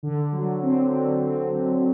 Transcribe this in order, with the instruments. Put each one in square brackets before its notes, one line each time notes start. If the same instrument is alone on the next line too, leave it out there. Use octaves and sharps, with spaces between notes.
[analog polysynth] D3
F#3
C4
D3
C4
D3